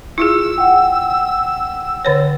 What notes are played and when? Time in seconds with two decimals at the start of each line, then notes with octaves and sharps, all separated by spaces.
0.18 E4 F4 G#4 E6
0.58 F#5 G5
2.05 D3 C5 C#5